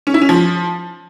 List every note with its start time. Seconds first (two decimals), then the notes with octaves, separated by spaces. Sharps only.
0.07 C#4
0.14 E4
0.22 C#4
0.29 F3